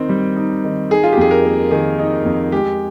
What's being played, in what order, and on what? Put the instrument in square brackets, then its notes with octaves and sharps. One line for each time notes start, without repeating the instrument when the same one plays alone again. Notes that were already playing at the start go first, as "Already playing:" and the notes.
Already playing: [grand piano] D#3 C4 D#4
G3
D#4
D#3
[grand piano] D#4 [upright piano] G#4
[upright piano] F4
G4
[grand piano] F2 [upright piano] G#4
[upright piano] A#4
[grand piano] A#3
[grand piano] D#3 [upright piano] G#4
[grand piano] D#4
F2
[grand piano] G#3 [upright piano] G4